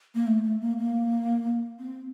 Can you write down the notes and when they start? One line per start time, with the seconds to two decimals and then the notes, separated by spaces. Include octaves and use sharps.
0.15 A#3
0.27 A3
0.44 A3
0.61 A#3
0.78 A#3
1.79 C4